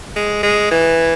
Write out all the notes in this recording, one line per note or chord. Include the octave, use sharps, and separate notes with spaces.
G#3
G#3
E3